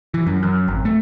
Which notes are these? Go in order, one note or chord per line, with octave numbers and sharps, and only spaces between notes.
E3
F#2
F#2
G#1
A3